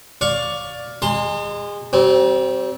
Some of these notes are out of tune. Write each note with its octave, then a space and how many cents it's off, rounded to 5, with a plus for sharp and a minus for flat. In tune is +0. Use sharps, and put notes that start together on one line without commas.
D5 +0 F5 +15 C#6 +10
G#3 -25 A5 +45 C6 +0
G3 -45 C4 -5